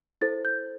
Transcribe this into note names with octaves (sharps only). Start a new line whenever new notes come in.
E4 A4 C5 A6
G6